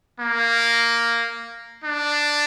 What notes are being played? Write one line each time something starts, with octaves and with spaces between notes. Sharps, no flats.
A#3
D4